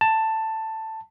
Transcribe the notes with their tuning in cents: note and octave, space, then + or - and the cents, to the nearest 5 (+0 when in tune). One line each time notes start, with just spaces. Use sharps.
A5 +10